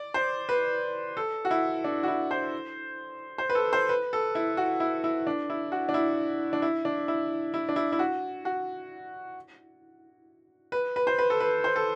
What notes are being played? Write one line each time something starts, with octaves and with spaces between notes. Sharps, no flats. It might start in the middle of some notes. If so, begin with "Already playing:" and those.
Already playing: D5
C5
B4
A4
F#4
E4
D4
F#4
E4
C5
C5
B4
A4
C5
B4
A4
E4
F#4
E4
E4
D4
E4
F#4
D4
E4
D4
E4
D4
E4
E4
D4
E4
E4
F#4
F#4
B4
B4
C5
B4
A4
B4
C5
A4